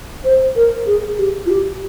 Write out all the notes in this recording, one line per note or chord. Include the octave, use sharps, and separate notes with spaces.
C5
A#4
G#4
G4
F4
G4